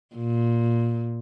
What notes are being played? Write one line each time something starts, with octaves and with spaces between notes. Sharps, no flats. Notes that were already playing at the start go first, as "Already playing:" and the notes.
A#2